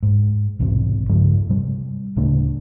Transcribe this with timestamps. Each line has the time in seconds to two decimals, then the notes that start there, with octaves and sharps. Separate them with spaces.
0.03 G#2
0.59 B1 E2 G#2 C3
1.09 G2 C#3 F3 G#3
1.49 C3 G3
2.16 D1 C#3 A3 D4